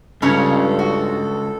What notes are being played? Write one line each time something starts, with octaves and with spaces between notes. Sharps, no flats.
C#2 G2 C#3 C#4 A4 C#5
F#4